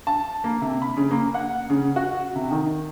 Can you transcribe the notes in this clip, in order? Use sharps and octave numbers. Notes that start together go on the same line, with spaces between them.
A5
A#3
C3
B5
C#3
A#3
F#5
C#3
F#4
C3
D#3